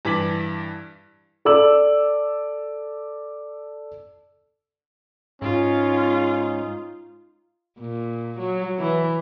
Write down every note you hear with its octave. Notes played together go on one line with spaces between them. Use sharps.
G2 E3 A5 D6 B6 F#7
A4 D5 D6 E6 F#7
G#2 C#4 D#4 F4
A#2
F#3
E3